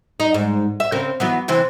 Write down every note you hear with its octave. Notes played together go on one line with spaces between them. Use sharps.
D#4
G#2
E5
C#3 C4 A#4
E3 F#3 B3
C3 E3 C4